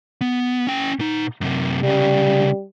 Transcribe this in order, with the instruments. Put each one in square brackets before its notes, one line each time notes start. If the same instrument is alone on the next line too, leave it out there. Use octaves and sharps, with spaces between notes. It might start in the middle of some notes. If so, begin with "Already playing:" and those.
[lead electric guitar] B3
C#4 G5
A#2 D#4
F#2 C3
[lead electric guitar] C2 C#3 [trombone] G3